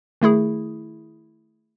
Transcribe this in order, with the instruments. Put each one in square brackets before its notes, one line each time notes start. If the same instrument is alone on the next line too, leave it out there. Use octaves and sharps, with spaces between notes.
[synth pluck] D#3 A3 E4 G#4